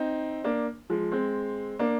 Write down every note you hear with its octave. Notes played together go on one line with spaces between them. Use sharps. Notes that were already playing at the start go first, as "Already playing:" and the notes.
Already playing: C4 D#4
A#3 D4
F3 G#3
G#3 C4
A#3 D4